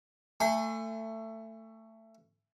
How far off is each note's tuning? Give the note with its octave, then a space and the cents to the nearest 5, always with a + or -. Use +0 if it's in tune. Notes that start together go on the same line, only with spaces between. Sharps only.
A3 +20 G#5 -15 C6 -35